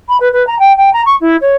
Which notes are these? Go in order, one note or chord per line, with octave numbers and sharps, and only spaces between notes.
B5
B4
B4
A#5
G5
G5
A#5
C#6
E4
C#5